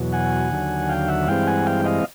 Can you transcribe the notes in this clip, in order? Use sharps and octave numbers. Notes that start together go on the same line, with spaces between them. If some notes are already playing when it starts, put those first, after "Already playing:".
Already playing: E2 B2 F#3
F#5 G#5
D#2 D3 F#3
F5 G5
E5 F#5
G2 E3 G#3 C4 F5 G5
F#5 G#5
F5 G5
D#5 F5